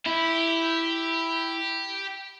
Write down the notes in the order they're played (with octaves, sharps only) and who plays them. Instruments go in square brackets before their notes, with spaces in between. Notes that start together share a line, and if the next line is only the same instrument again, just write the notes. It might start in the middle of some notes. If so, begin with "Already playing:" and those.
[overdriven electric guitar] E4 [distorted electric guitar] G4